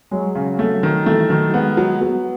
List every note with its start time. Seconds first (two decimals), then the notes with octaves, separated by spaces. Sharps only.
0.11 F#3 G#3
0.35 C#3
0.59 A3
0.83 D#3
1.06 E3 A3
1.30 D#3 F#3
1.48 F#3
1.54 G#3 B3
1.77 F#3
2.01 F#3 B3